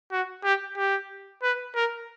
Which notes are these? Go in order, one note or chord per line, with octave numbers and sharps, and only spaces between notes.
F#4
G4
G4
B4
A#4